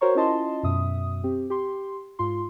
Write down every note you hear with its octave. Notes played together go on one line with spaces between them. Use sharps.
F#4 A#4 C5 C#5 A#5 C#6
C#4 E4 F4 D#5 A5 C6
F#2 B2 E5 D#6
C4 G4
G4 C6
G#2 F4 C6